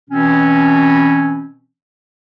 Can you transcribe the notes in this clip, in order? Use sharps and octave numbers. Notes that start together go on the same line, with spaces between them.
B2 E3 C4 C#4